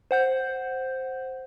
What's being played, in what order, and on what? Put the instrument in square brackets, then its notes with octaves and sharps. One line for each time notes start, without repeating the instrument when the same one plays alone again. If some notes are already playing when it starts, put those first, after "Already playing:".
[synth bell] C5 F#5 G6